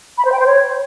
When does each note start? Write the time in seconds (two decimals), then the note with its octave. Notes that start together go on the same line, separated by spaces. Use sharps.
0.18 B5
0.25 C5
0.32 G5
0.39 C5
0.46 C#5